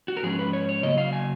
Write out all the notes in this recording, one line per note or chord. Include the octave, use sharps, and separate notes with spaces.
F#4
A#4
G#2 F3 C#4 G#4
B4
C#5
C#5
C#3 F#3 A#3 D#5
F5
G#5